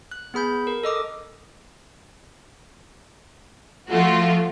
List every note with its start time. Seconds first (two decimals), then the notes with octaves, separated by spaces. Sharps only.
0.11 F#6
0.34 B3 G#4 B5 G6
0.67 A#4
0.84 A4 D#5 D6 D#6
3.89 F3 A3 F4 F#4